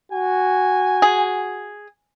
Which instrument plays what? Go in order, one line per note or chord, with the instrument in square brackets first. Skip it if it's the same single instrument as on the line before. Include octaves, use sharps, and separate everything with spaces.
[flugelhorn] F#4 [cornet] G#5
[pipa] G#4